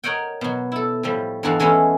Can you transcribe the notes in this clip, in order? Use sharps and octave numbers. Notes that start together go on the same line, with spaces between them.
A#4 C#5 D#5 F#5 G5
B2 F#3
E4 A4
A2 F3 G3
E2 G2 G#3 F#4 A4 F5
E3 G#3 A3 C#4 E4